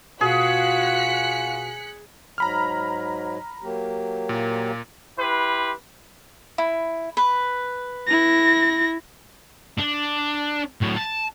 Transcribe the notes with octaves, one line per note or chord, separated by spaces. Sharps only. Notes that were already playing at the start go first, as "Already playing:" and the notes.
B2 F4 F#4 G#4 F#6 B6 C#7
G#2 F#3 A#5 B5 F6
F#3 A#3 G4
A#2
E4 G4 B4 C6
E4
B4
E4 A#6
D4
A2 F#3
A5